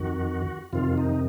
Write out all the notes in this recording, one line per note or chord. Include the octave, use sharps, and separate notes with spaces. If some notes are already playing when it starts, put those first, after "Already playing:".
Already playing: F2 D#3 F#4
F2 C3 D#3 F4
D#4